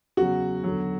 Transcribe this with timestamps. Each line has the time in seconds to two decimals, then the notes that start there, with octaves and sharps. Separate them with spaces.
0.17 E2 C#3 F#3 F#4
0.64 E2 D3 F#3